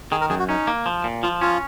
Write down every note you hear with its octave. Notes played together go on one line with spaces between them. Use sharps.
D#3 G#4
A#4
F#2 G#4
F#4
C#4 D#4
A#3
F3
A#2
F3 F4
C#4 F4